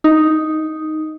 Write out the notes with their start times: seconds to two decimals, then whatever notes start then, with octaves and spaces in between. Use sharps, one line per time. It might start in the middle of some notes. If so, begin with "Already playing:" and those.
0.04 D#4